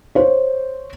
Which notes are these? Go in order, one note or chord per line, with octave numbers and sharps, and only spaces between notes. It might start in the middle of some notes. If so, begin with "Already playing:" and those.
C5 C#5